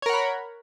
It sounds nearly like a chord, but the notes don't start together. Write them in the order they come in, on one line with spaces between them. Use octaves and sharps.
C#5 A#4 F#5 B5